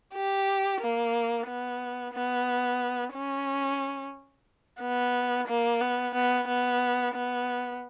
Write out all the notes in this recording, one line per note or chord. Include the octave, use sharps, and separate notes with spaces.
G4
A#3
B3
B3
C#4
B3
A#3
B3
B3
B3
B3